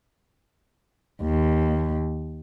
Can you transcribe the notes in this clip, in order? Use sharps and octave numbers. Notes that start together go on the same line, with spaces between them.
D#2